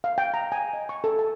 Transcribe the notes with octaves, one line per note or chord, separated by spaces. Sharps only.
F5
G5
A#5
G#5
D#5
C#6
A4
A5